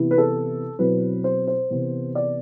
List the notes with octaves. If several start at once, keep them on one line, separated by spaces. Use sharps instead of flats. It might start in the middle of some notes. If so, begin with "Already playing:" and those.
Already playing: C3 E3 B3 E4
B4
A4
B2 F#3 C4 E4 B4
C5
C5
C3 E3 B3
D5